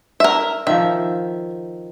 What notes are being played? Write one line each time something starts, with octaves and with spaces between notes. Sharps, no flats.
A#4 E5
D#3 F3 E5